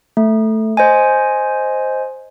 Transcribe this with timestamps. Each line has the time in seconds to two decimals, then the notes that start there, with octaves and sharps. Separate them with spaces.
0.17 A3
0.77 C5 D#5 G#5